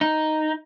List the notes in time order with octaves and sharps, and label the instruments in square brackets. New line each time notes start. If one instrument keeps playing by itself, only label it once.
[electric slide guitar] D#4